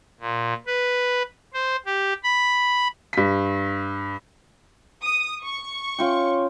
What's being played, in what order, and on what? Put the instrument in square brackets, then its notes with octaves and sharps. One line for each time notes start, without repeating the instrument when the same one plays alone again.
[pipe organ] A#2
B4
C5
G4
B5
[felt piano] G2 B6
[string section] D#6
C#6
[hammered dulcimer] C#4 F4 G5